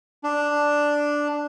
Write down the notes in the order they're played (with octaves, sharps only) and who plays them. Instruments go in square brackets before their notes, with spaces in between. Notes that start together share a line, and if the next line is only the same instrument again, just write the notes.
[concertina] D4